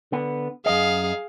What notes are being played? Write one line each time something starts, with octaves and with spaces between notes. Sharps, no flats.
D3 B3
F#2 G#4 D#5 F5